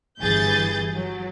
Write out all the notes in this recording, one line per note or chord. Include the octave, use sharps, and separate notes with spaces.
G1 E3 G#4 G6 A6
F#3